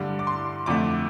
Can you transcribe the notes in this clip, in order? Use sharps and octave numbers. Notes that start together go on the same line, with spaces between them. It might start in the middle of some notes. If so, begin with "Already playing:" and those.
Already playing: G2 D3 G3 D6
D6
C6
F2 D3 A3 D6